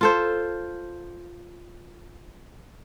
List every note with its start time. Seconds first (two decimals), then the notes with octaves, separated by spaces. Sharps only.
0.01 F4 A4 C5